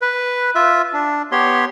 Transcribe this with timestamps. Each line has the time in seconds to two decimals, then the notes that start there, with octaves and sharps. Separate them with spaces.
0.02 B4
0.55 F4 E5
0.93 D4
1.32 B3 G4 C#5 C6